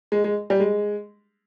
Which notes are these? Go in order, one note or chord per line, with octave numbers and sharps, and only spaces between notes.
G#3
G#3
G3
G#3